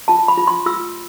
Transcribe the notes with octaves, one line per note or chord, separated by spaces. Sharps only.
F4 A5
B5
F4
C6
F4 E6